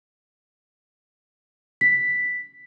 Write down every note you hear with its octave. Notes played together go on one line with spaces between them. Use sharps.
B6